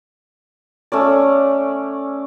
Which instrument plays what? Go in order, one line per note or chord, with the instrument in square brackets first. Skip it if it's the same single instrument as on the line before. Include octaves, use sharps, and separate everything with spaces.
[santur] A3 C#4 D5